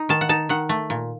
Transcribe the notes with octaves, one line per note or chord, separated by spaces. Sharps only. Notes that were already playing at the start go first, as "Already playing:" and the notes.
Already playing: D#4
D#3 A5
F#5
D#4 A5
D#3 F#5
A3
A#2